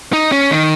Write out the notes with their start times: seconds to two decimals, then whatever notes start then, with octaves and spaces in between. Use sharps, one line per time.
0.13 D#4
0.32 C#4
0.51 D#3